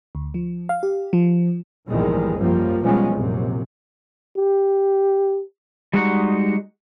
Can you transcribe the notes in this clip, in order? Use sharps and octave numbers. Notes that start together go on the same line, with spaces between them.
D2
F3
F5
G4
F3
A#1 E2 G#2 D#3 G3 G#3
F#2 F3 G3 A#3
B2 F3 G3 G#3 B3 C#4
A#1 F#2 C3
G4
G3 G#3 D#4 F#4 F#5